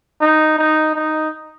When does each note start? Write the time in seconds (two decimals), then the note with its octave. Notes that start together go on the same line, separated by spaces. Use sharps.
0.21 D#4
0.58 D#4
0.95 D#4